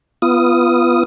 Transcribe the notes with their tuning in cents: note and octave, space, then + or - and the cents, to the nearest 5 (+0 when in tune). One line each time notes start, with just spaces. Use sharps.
B3 +0 F4 -25 D#6 +0